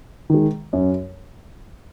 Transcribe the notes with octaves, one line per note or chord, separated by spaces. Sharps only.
D#3 G#3
F#2